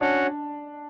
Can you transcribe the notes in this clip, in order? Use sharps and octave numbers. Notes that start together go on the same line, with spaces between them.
C#4 D4 F#4 C#5 F#5